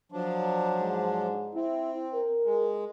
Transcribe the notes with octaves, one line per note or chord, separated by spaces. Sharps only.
F3 F#3 D4
G#2
C4 E4
A#4
G#3